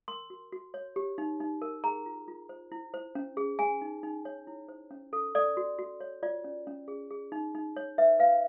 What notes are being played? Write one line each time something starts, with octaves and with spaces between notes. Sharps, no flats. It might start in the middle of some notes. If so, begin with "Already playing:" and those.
A#4 C6
F#4
F#4
C#5
G4
D#4
D#4
A#4
G#4 A#5
F4
F4
C5
E4
C5
C#4
G#4
G#4 G#5
D#4
D#4
C#5
E4
C5
C#4
A4
A4 D5
F#4
F#4
C#5
F4 D5
C#4
C#4
G#4
G#4
D#4
D#4
C#5
B4 E5
B4 F5